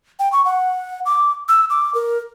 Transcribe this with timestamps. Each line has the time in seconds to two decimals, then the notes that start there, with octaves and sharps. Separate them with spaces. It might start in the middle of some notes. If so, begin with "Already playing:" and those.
0.19 G5
0.32 C#6
0.45 F#5
1.06 D6
1.49 E6
1.70 D6
1.95 A#4